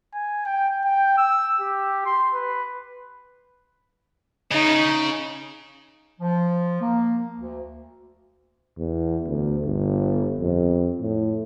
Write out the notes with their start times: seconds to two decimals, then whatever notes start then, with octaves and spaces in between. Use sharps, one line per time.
0.14 G#5
0.46 G5
0.85 G5
1.18 E6
1.60 G4
2.06 C6
2.34 B4
4.51 C#3 D#4
6.20 F3
6.81 A#3
7.39 D2
8.78 E2
9.27 D2
9.65 G1
10.40 F2
11.01 A2